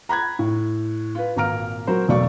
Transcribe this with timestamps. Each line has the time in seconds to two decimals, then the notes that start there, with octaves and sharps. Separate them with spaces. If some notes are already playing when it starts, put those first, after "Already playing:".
0.09 A#5 B5 F#6 G#6
0.39 A2
1.15 F4 B4
1.36 G#1 A#2 A#5 F6 D7
1.87 F#3 F#4 A#4 C5
2.08 E1 B1 A3 D5 C#6